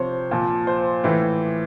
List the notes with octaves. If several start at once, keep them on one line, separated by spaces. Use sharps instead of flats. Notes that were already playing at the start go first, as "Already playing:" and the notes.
Already playing: C3 F3 C5 C#5
A#2 F3
C5
A2 E3